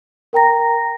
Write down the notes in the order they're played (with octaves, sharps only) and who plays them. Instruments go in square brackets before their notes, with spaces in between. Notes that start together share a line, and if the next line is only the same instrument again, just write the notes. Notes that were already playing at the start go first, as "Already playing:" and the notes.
[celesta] A#4 G5 A#5 A#6